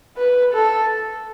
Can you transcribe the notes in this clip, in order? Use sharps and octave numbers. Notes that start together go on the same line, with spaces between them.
B4
A4